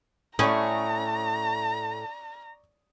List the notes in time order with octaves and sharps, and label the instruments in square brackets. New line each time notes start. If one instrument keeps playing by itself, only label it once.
[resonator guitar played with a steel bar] A2 A3 [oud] C#4 [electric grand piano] D5 C#6 D#6 [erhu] A#5